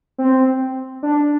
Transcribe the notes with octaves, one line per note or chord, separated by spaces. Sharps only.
C4
D4